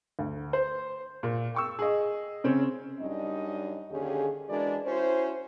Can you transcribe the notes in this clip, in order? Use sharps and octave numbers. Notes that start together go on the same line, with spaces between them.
D2
C5
A#2
G5 C#6 E6
G#4 D#5
C#3 C4 C#4
F#2 G3 D4 D#4 D#5
D#2 D3 C#4 G4 G#4
E3 G#3 D4 F#4 A#4 D5
C#4 E4 F#4 C5